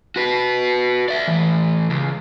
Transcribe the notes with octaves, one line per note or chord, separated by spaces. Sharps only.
F#4 B4
D5 E5
A2 E3
C#2